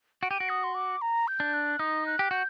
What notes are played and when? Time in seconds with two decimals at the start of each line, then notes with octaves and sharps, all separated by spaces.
0.22 F#4 D7
0.30 G4 D#7
0.38 F#4 D7
0.49 D#6
0.63 C6
0.75 D6
1.01 A#5
1.28 G6
1.40 D4
1.53 F#6
1.79 D#4 D#6
2.06 F#6
2.19 G4
2.31 F#4 G6